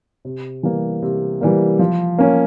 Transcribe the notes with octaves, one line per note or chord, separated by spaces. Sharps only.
C3
E3 G3 A#3
C3
E3 G3 A#3
F3
A#3 C#4